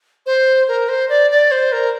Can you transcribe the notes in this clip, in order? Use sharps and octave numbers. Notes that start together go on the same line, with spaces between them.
C5
A#4
C5
D5
D5
C5
A#4